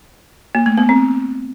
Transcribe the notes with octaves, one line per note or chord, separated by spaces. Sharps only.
A#3
A3
B3
C4